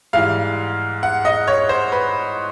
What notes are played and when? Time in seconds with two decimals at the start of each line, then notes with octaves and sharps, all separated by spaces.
0.13 G#2 E3 G3 F5
1.03 F#5
1.25 D#5
1.48 C#5
1.69 C5
1.92 B4